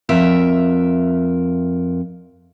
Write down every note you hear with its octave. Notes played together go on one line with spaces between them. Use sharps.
F2 A#4 E5